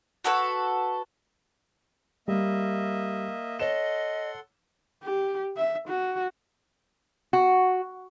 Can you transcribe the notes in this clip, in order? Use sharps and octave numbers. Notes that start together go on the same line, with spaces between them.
F#4 A4 B4 C#5
G3 A#3 D#5 E5
A4 C#5 D#5 F#5 C6 E7
G4
E5
F#4
F#4